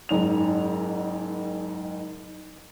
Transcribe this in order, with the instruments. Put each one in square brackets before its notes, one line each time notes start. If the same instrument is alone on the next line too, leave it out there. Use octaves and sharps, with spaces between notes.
[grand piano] F#1 G#2 F7